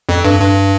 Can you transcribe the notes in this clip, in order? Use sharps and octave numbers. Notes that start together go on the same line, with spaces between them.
F2
G2
G2